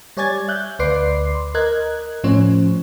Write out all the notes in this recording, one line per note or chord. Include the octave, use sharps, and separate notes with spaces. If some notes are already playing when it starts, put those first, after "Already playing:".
G3 C#5 D5 G#5 G#6 A6
E5 F#6 G6
D2 B4 D5 C6 D6 C7
A#4 D#5 F#6 G#6
A2 F3 C#4 C5 C#5